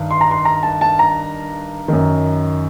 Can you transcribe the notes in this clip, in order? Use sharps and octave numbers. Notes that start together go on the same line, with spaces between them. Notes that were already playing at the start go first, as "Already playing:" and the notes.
Already playing: G2 D#3
C6
A#5
C6
A#5
A5
A5
A#5
F#2 D#3